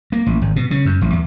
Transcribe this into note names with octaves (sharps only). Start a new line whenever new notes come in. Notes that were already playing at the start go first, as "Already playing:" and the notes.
A#3
A1
G#1
B2
C#3
F#2
A1
E2